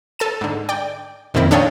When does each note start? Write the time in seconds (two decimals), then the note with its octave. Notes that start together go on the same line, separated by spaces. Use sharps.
0.19 A4 A5 D#7
0.41 G#2 D3
0.69 D5 G5
1.34 F2 A#2 D#3 C4 E4
1.51 D4 A4 C#5 D#5 F5 G5